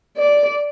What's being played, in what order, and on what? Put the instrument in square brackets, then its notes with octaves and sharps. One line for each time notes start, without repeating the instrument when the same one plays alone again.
[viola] D5